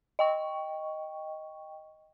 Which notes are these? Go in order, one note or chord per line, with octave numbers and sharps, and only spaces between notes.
D#5 G5 C#6